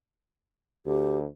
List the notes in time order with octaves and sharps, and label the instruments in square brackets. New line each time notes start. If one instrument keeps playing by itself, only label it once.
[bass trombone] D2 [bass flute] G4